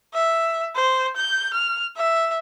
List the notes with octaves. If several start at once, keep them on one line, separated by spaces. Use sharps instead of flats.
E5
C5
G6
F6
E5